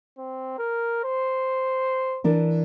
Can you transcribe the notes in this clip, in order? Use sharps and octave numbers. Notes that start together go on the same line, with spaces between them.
C4
A#4
C5
E3 D4 A#4